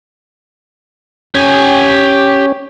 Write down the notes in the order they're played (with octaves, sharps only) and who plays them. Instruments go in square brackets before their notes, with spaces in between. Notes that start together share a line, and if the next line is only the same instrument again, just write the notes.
[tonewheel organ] C#4 [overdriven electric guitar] G4 G#5